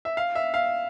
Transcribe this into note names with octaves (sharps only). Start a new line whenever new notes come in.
E5
F5
E5
F5